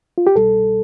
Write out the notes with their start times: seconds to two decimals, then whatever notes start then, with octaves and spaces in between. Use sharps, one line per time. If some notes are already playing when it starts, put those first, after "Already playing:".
0.18 F4
0.27 G4
0.35 C2 B2 G3 A4